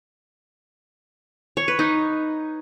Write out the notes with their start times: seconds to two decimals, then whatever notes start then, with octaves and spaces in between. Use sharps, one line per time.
1.57 C#5
1.68 B4
1.79 D#4